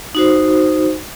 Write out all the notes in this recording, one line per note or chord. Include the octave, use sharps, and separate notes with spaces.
D#4 F#4 C5